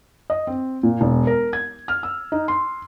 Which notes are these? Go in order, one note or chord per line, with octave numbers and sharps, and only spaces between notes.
D#5
C4
A#2
E1
A#4
G#6
F6
E6
D#4
C6